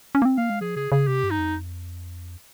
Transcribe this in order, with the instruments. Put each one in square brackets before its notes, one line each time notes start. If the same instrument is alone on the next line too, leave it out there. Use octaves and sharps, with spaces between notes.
[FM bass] C#4
A#3
C4
[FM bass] A#3 [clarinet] F5
[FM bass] G#3
[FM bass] F3 [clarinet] G#4
[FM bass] C#3 [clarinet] G#4
[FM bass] C#3 [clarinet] G#4
[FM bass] C3 [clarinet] G4
[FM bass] G2
[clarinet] D#4
[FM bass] F2